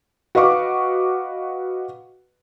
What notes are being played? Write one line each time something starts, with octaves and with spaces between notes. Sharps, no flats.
F#4 B4 D#5 F5 C#6 D6